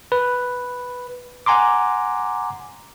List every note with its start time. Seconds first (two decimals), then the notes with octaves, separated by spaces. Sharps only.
0.12 B4
1.46 F#5 G#5 A#5 C6 D6